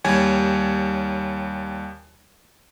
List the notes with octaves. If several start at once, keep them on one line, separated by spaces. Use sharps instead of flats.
D#2 G3 C#5 G#5 G#6